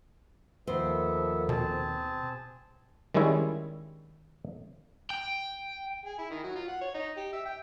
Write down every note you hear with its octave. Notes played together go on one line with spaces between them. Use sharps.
D#2 F3 B3 A4 A#4 C5 E5
B2 C4 G#4 A5
D#3 G3 G#3 C#4 E4
G5
G#4
E4
D#3
F#3
F4
F#5
C#5
D#4
G4
E5
G5